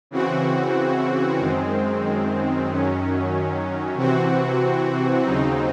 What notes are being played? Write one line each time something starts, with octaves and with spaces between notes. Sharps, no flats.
C#3 E3 C4 F#4
F#2 D#3 G#3 C4
F#2 D#3 F#3 C#4
C3 E3 C4 F#4
D#2 C#3 F#3 C4 D#4